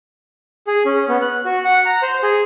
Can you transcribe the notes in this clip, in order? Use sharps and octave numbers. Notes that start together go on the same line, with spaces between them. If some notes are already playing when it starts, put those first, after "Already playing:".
G#4
C#4
B3
F#6
F#4
F#5
A#5
C5
G#4